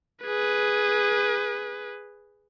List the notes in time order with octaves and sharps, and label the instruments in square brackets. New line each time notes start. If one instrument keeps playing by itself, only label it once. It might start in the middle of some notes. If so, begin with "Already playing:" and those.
[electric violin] G#4 B4